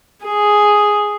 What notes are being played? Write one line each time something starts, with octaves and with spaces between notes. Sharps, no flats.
G#4